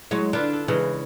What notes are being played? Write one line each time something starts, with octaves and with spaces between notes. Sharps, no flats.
F#3 G#3 E4 C#5
D3 D4 F4 B4
A4
C#3 E3 G#3 B4